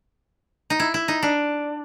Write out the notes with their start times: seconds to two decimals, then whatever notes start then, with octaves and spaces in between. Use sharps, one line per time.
0.70 D#4
0.80 E4
0.94 E4
1.08 D#4
1.23 D4